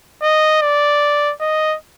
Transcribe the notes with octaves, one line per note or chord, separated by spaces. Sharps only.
D#5
D5
D#5